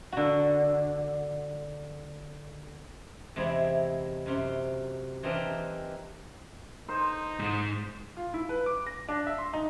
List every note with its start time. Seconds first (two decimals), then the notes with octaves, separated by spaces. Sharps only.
0.12 D3 F#4
3.36 E2 C3 G#3 C4 E4
4.26 F#2 C3 C6
5.23 E3 C4 D4 D#4 G4 A#4
6.89 D#4 C5
7.39 G#2 G#3
8.17 F4
8.34 E4
8.49 B4
8.66 D6
8.86 A#6
9.09 D4
9.26 E5
9.38 C6
9.53 D#4